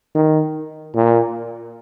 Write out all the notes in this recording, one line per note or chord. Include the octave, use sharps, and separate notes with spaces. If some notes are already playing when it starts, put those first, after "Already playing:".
D#3
A#2